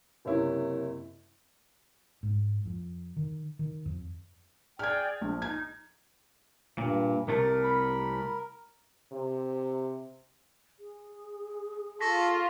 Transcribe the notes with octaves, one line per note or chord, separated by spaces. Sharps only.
F#1 C3 C#4 E4
G#2
F2
D#3
D#3
F2
G#4 D5 G5 F6 G#6
A#1 D4
D#4 G#6
G2 A#2
C2 C3 A3 A#4
B5
C3
G#4
F4 A4 C#6 A#6 B6